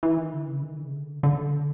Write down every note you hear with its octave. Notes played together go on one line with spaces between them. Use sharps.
E3
D#3
D3
C#3
D#3
D3
C#3
D3
D3